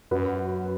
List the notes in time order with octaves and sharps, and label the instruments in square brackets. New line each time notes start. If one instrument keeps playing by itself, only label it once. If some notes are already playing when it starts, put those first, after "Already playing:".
[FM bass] F#2 [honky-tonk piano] F#4 B4